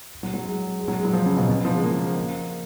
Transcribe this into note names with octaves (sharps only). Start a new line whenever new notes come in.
F#3
F#3
G#3
G#3
F#3
G#3
F#3
F3
C#3
B2
B2
C#3
F3
G#3
A#3
A#3